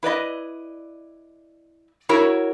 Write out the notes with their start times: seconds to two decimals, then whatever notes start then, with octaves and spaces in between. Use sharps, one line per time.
0.03 E4 B4 D5 D#5
2.09 E4 F#4 A#4 C#5